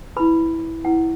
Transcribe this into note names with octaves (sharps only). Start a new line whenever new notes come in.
E4 B4 B5
E4 B4 F#5